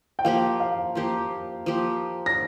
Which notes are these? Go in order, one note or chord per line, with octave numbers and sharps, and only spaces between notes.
G5
F3 A#3 G4 F5
F5
F3 A#3 G4
F3 A#3 G4
A#6